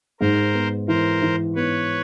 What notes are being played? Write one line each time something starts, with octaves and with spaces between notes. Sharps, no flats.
G#2 A#4 C5
B3
E3 A#4 C5
E3
B3 B4 C#5